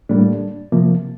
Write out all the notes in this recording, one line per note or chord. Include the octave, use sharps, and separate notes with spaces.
A2 G3 A#3 D4
C3 F3 A#3